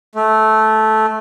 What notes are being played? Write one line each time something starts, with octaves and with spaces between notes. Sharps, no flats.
A3